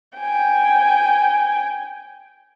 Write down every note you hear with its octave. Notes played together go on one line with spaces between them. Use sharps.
G5 G#5